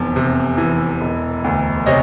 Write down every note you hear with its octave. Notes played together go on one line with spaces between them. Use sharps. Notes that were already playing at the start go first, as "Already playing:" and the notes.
Already playing: F1 E2
C3
E3
E1
D2
C3 C#5 D#5